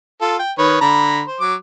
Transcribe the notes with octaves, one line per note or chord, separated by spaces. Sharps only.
F4 A4
G5
D#3 B4 C#5
D3 A#5 B5
C5
F#3 D6